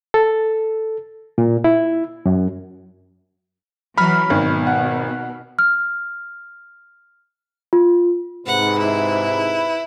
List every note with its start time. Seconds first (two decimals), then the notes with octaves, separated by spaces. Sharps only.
0.14 A4
1.38 A#2
1.64 E4
2.26 F#2
3.98 E3 F#3 B5 F6
4.30 G#1 B2
4.67 F#5
5.59 F6
7.73 F4
8.46 G#2 C3 B4 F#5
8.79 E4